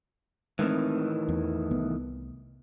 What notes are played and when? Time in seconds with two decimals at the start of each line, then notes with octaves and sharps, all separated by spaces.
0.59 A2 D#3 E3 G#3 C4
1.29 E2
1.71 C2 B3